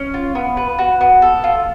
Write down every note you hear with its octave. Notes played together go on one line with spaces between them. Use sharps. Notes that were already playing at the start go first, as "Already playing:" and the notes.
Already playing: C#4
F4
B3
B4
F#4
B3
A4
F4